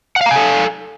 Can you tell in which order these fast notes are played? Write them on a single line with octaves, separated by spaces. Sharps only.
F#5 F5 A#5 G#5 A4